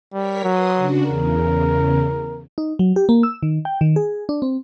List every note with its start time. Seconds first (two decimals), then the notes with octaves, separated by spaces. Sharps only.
0.13 G3 A#4 C#5 B6
0.44 F#3 B4 C6 D#6
0.74 C#3 D4 F#4
1.05 E2 C#3 A#4
2.58 D#4
2.79 F#3
2.96 G4
3.09 A#3
3.23 E6
3.43 D#3
3.65 G5
3.81 D#3
3.96 G#4
4.29 D4
4.42 C4